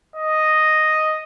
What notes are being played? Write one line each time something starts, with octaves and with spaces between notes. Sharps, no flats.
D#5